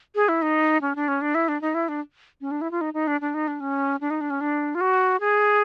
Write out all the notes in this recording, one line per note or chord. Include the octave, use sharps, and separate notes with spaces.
G#4
E4
D#4
C#4
D4
C#4
D4
E4
D4
D#4
E4
D4
C#4
D4
E4
F4
D#4
D#4
D4
D4
D#4
D4
C#4
D4
D#4
D4
C#4
D4
F4
F#4
G#4